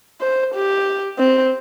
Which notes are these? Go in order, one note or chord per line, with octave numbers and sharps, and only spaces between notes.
C5
G4
C4